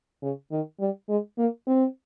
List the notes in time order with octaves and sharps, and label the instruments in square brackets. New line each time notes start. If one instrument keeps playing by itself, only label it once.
[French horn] C#3
D#3
G3
G#3
A#3
C4